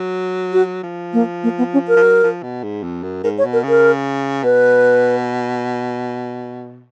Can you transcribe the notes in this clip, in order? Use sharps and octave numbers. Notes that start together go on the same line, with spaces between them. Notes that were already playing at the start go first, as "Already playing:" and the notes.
Already playing: F#3
F#4
F3
A#3
A#3
B3
C#4
A#4
F3
F#3
F3
B2
G#2
F2
F#2
G#2 A#4
C#5
B2
A#4
C#3
A#4
B2 B4